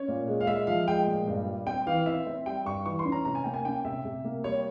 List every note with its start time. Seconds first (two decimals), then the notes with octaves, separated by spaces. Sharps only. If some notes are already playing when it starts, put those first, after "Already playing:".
Already playing: C#4 C#5
0.08 A#2
0.28 G#3
0.41 F5
0.47 G#3 E5
0.67 F3 F5
0.87 G#3 G5
1.07 A#2
1.27 G2
1.47 G3
1.67 C4 G5
1.87 E3 F5
2.06 C4 E5
2.27 C4
2.46 G3 G5
2.65 G2 C#6
2.86 E3 C#6
2.99 C6
3.05 C#4
3.12 A#5
3.25 C3 A#5
3.35 G#5
3.44 A#3 G5
3.54 G#5
3.65 C#4 G5
3.85 C3 E5
4.05 C3
4.25 A#3
4.44 G3 C#5